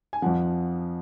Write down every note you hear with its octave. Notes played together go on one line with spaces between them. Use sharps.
G#5
F2 F3 F#5